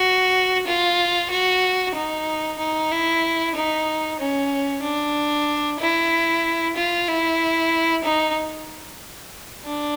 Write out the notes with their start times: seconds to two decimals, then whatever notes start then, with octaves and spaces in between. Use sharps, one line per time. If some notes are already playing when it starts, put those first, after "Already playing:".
Already playing: F#4
0.67 F4
1.30 F#4
1.95 D#4
2.59 D#4
2.91 E4
3.55 D#4
4.19 C#4
4.83 D4
5.80 E4
6.76 F4
7.08 E4
8.04 D#4
9.65 D4